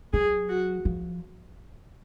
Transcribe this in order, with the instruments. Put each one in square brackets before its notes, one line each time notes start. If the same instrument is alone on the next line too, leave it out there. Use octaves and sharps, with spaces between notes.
[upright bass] F#3 [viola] G#4
[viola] F#4
[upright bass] F3